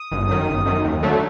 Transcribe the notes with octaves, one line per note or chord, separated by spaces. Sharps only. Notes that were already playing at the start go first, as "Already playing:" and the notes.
Already playing: D#6
G1
F#2 D#3
G1
F#2 D#3
D#2
D3 F#3 A3